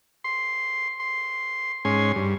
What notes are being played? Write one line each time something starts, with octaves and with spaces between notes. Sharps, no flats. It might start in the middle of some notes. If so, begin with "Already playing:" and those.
C6
C6
G#2 C#4 G#5 C6
G2